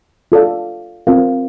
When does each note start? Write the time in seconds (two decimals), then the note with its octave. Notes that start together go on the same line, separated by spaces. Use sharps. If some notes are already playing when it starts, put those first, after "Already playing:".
0.32 F4 A4 D5 F5
1.07 C4 F4 A#4 F5